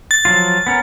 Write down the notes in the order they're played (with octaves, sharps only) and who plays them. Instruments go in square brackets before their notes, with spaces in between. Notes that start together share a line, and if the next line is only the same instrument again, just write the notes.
[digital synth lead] A6
[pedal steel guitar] F3 F#3 F4
B3 C#4 A#4